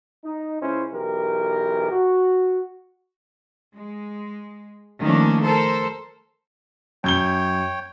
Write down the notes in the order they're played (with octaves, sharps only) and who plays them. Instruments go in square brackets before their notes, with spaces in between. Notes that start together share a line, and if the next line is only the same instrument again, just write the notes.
[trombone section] D#4
C#2 C#4 E4 C5
B1 E3 G4 A#4
F#4
[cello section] G#3
D#3 F3 A3 A#3 C#4 D4
A4 A#4 C5
[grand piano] F#2 G6 G7 [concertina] C#5 G5